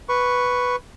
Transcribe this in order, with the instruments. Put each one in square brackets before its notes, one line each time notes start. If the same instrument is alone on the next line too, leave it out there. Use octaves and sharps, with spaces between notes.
[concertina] B4 C#6